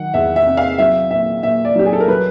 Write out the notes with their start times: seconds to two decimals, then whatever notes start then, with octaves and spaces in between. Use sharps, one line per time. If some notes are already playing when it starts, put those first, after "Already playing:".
Already playing: D#3 F#3 F#5
0.14 E2 E5
0.36 E5
0.46 C3
0.57 F5
0.78 F#3 E5
1.11 A#2 E5
1.43 A#2 E5
1.65 D5
1.75 F#3 G4
1.85 G#4
1.93 A4
2.00 A#4
2.08 F#3 B4